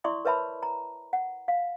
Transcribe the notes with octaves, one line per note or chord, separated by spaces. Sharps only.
E4 D5 E5 C6 C#6 D#6
A#4 B4 C#5 E5 A5 B5
A#5
F#5
F5